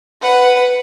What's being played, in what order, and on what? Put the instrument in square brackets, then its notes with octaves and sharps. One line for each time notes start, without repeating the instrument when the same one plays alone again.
[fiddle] B4 F#5